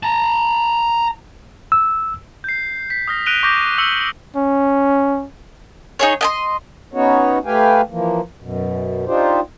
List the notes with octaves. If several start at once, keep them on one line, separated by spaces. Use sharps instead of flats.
A5 A#5
E6
G6 C7
B6
D#6 F6 A#6
F#6 A#6 D7 D#7 F7 G7
C#6 D6 G6 A#6
C#6 E6 F#6 C#7 F#7 G7
C#4
D#4 G#4 C#5
D#5 G#5 C6
B3 C#4 D#4 F#4 C#5
A3 G4 B4 F5 G5 G#5
E3 F3 A#3
F#2 B2
D4 D#4 F4 G4 C5